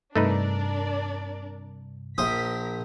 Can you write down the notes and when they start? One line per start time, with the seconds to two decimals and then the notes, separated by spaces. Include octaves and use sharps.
0.15 G2 C3 A3 D4 D#4 A#4 B4 D5
2.18 A#1 A#4 C5 D#6 B6